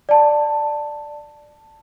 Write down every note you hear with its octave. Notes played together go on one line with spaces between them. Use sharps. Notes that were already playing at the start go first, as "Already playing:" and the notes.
D5 A5